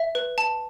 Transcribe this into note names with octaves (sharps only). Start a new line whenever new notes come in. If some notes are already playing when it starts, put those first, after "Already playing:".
Already playing: E5
B4
A5